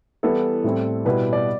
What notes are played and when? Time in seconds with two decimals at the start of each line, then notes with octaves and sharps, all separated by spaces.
0.23 E3 G3 B3 E4 A4
0.64 A2 G3 C4 E4
1.05 B2 G3 B3 E4 B4
1.33 D5